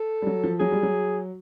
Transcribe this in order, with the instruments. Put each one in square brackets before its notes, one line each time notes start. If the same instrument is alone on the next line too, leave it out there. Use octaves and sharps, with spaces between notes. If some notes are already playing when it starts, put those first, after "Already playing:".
Already playing: [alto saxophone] A4
[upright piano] G3
F#3
F3
[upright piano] F#3 [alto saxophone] G#4
[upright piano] G3
F#3